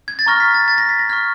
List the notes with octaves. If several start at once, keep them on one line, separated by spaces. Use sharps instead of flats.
G#6
A6
A#5 C#6 F6 A#6
B6
A6
A6
A#6
B6
A#6
C#6 F6 G#6